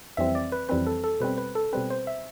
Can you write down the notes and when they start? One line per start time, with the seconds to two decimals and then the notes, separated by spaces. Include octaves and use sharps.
0.17 F2 E3 G3 C4 E5
0.35 D5
0.52 B4
0.69 F2 E3 G3 C4 B4
0.86 A4
1.04 A4
1.20 B2 G3 C4 B4
1.38 B4
1.55 A4
1.73 B2 G3 C4 B4
1.90 C5
2.07 E5